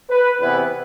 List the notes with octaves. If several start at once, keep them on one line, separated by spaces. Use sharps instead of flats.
B4
E2 C3 E3 B3 E4 B4